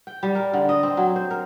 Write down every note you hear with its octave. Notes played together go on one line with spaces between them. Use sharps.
G5
G3
A#4
D3
D#5
C4
F#3
C5
A#4